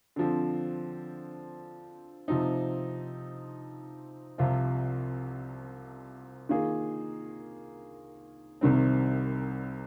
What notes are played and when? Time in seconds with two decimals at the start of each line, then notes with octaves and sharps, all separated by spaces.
0.16 D3 F3 C4
2.28 C3 F3 C4 D#4
4.38 C2 C3 F3 C4 F4
6.49 D#3 A#3 F4 G#4
8.61 C2 C3 D#3 G3 C4